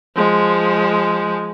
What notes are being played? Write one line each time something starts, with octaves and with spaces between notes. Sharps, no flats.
F3 G#3